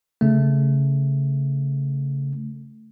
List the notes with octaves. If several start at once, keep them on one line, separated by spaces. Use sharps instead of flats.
C#3 A3